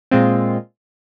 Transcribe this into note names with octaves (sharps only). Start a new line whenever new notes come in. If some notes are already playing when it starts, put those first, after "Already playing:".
A#2 G#3 C4 F4